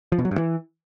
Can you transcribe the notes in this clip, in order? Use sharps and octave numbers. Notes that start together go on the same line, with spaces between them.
F3
B2
F#3
G2
E3